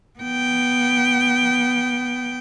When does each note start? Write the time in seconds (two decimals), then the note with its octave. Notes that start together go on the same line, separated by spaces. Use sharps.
0.19 B3 G5